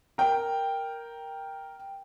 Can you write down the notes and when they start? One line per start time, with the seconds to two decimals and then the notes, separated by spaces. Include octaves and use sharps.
0.18 A#4 G5